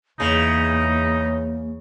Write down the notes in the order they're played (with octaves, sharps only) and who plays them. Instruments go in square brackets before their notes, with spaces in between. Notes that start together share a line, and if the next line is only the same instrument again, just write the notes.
[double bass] E2 [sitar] C#3 [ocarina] A#3 [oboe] D#4